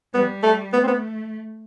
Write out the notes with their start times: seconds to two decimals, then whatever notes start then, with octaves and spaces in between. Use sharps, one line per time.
0.14 G3 B3
0.43 A3
0.73 A3 B3
0.84 C4
0.87 B3